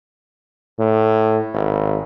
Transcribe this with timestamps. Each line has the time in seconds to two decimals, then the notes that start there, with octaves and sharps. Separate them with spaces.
0.79 A2
1.54 G#1